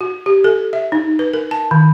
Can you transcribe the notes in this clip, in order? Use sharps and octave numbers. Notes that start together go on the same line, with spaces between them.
F#4
G4
A4
E5
D#4
B4
A#4
A5
D#3